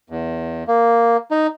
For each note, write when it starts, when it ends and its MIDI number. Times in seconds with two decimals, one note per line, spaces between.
0.10 0.64 40
0.68 1.17 58
1.31 1.47 63